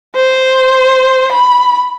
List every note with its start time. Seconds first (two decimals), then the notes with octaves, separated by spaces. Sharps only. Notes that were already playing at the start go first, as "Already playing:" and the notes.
0.16 C5
1.33 B5